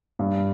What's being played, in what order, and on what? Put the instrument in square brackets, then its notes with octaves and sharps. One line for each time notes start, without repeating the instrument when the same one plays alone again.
[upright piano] G2